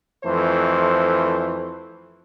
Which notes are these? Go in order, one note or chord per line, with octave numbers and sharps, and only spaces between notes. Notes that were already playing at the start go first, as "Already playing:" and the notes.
F2 E3 A3 C5